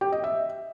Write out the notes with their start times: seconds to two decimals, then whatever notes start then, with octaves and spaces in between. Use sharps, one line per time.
0.01 G4
0.12 D#5
0.24 E5